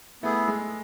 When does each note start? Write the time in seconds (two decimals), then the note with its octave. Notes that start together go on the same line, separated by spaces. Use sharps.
0.23 A3 B3 E4 G#4
0.48 G#3